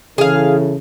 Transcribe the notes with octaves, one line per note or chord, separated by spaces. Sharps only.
C#3 E3 E4 G#4 A4 F5